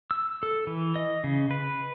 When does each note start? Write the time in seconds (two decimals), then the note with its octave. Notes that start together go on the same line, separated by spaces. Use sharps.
0.11 E6
0.43 A4
0.67 E3
0.96 D#5
1.24 C#3
1.51 B4